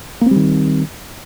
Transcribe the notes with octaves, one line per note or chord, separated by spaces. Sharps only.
D#3 G3 A#3 C4